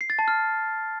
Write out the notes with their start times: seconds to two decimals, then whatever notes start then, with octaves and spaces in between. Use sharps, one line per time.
0.01 C7
0.10 A6
0.19 A5
0.28 F6